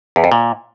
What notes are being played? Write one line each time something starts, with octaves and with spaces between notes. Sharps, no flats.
E2
F2
A#2